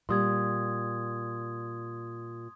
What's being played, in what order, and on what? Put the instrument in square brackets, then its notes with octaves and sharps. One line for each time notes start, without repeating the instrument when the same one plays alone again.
[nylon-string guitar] A#2 G3 [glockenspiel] C6 D#6 G#6